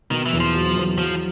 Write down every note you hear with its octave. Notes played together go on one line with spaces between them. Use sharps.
B2 D#3
E3
E2
F3
F#3
E2
F3 F#3